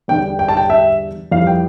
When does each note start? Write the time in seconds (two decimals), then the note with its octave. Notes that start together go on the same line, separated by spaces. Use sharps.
0.08 E2 D3 G3 D4 G5
0.39 G5
0.49 A5
0.57 G5
0.70 E5
1.31 F2 E3 G3 F5
1.47 G5